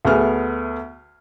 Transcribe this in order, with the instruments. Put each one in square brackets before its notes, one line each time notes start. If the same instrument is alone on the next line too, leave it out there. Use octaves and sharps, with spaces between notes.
[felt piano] D2 A3 B3 G#4 F6